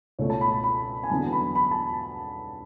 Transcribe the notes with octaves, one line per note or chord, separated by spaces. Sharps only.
C#2 B2 A3 C#5
A5
B5
B5
G#5
E2 D3 F#3 B3 A5
B5
B5
A5